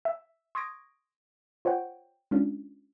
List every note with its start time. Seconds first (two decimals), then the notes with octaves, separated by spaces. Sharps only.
0.05 E5
0.55 C6 C#6 D#6 G#6 A#6 D7
1.65 F4 C5 C#5 F#5 G5
2.31 G#3 C#4 D4 F4